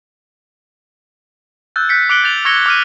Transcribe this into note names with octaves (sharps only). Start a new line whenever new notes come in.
E6 F#6 G6 A6
E6 F#6 G6 B6 C#7
D6 F#6 C#7 D7 F#7 G7
G6 A6 F7 G7
C#6 E6 G#6 A#6 C#7 G7
D6 F6 D#7